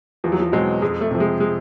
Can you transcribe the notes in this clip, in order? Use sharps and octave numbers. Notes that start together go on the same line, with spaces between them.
E2 F3
F#3
F3
B2 F#3 G#3 C4
F2 G#3
A3
C3 F3
G#3
G#3